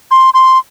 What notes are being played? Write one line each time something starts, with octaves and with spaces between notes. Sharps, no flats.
C6
C6